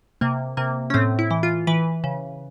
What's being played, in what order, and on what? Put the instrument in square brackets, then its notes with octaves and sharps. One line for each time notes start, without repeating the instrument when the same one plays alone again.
[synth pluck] C3 A#3
C3 A#3
C#4
A2 C4
E4
E3
F4
E3 B4
C#3